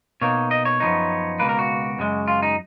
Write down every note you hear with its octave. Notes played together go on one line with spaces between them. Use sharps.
B2 A#3 D#4 C#5
D#5
C#5
F#2 F3 B3 D#4
C#2 B2 A#3 B4
A#4
F#4
F#2 C#3 G#3
F4
D#4